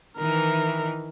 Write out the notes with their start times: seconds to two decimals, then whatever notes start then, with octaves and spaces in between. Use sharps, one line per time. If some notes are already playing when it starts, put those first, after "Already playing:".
0.18 D#3 E3 A#4